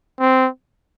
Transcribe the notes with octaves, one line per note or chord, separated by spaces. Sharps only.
C4